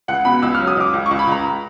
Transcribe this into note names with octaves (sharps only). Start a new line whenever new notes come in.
C#2 F#5
B2 B5
C#2 E6
F#3 F6
D#6
C#2 D6
C#2
C#2 C#6
B5
C#2 A#5